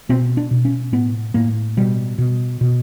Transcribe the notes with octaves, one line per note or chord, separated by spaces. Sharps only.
B2 C4
D4
B2
C#4
A2 B3
A2 A#3
B2 G3
B2
B2